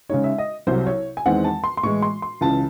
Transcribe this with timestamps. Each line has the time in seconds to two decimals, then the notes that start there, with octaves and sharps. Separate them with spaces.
0.09 C#3 G#3 D#4 C#5
0.24 E5
0.38 D#5
0.67 C2 C3 F#3 C5
0.87 C#5
1.17 G#5
1.26 E2 D#3 G#3 C4 F#5
1.44 A5
1.64 C6
1.77 C6
1.83 A2 E3 G#3 C#6
2.02 C6
2.22 C6
2.41 C#2 C#3 E3 A5